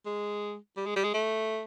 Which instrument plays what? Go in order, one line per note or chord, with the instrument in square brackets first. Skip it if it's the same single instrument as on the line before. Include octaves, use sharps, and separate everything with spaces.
[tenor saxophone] G#3
G3
G#3
G3
G#3
A3